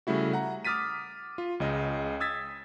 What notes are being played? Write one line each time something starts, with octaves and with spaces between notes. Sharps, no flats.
C#3 G3 A3 E4 F#4
F#5 A#5
D6 D#6 F6 A6 B6 D#7
F4
C#2 C#3 D#5
D#6 E6 G#6 A6 B6